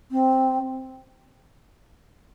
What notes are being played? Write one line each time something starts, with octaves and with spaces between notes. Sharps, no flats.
C4